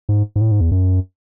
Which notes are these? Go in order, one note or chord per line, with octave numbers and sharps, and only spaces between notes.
G#2
G#2
A2
G#2
E2
F#2